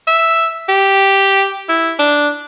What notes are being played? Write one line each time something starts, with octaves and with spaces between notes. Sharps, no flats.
E5
G4
E4
D4